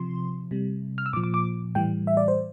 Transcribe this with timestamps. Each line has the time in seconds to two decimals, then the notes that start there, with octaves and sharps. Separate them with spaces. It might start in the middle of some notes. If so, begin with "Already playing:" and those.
Already playing: C3 F3 C6
0.51 C3 G3
0.98 F6
1.06 E6
1.13 A#2 F3 D6
1.24 D6
1.34 D6
1.75 A2 E3 G3 G5
2.07 E5
2.17 D5
2.28 C5